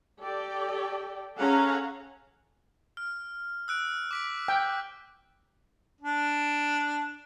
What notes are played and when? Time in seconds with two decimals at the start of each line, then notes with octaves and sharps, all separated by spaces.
0.19 G4 A4 D5 G5
1.37 C#4 G#4 A4 F5 F#5 A#5
2.97 F6
3.68 E6 F#6 D7
4.11 D6 B6 D7
4.48 G5
6.01 D4